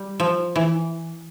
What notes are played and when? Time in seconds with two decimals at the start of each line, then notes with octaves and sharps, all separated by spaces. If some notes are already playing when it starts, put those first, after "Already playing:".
Already playing: G3
0.20 F3
0.56 E3